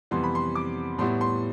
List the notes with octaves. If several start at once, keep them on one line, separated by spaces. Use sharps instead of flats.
F2 C3 E3 G3 B3 C6
B5
C6
D6
A2 G3 B3 E4 C6
C6